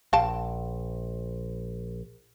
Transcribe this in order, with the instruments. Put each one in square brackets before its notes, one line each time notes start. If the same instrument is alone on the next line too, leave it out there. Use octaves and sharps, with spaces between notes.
[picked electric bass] A#1 [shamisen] F5 G5 A5